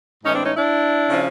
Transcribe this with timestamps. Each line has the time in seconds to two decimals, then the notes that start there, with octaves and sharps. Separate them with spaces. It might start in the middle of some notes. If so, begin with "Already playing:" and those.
0.24 A2 E3 G#3 C#4 D#4
0.34 C4 D4
0.45 C#4 D#4
0.56 D4 E4
1.10 C#3 F3